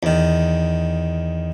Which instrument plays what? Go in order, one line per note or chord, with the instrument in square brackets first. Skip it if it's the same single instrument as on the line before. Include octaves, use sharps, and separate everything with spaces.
[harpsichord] E2 D#3